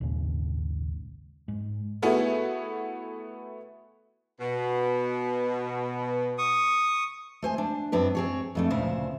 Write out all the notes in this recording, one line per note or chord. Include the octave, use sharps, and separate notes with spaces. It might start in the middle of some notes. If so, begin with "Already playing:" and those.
A#1 D#2 G#2 C#3
G#2
A3 B3 E4 F#4 G#4
B2
C#6 D#6
A3 C5 G#5
D4
F#2 C4 D4 B4
C4 G#4 C#5
F2 A3 D4
D2 A#2 C#3 C5 E5